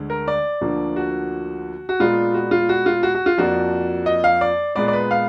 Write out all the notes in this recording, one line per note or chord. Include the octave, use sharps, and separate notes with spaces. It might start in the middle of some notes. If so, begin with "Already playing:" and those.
Already playing: D2 D3 G#3
A#4
D5
D2 D3 F3 A#3
F#4
F#4
A#2 G#3 B3 D4 F4
F#4
F4
F#4
F4
F#4
F#4
F4
F2 F3 A#3 D4 F#4
D#5
F5
D5
A#2 G#3 B3 D5
D5
B4
F5